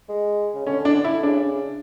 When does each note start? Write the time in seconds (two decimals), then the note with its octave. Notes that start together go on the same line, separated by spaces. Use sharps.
0.09 G#3
0.55 C#3
0.66 D3 C#4
0.85 D4
0.94 D3
1.04 E4
1.23 C#3 D4